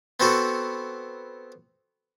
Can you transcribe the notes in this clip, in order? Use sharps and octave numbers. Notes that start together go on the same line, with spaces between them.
B3 C4 F#4 A4